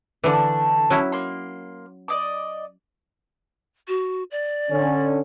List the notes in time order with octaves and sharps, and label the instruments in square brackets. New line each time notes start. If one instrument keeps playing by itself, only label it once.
[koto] D3 E3 [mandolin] A3 D4 A5
[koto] F#3 C#4 E4
[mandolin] A#3 C6
D5 D#5 D6
[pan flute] F#4
D5
[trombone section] D3 C#4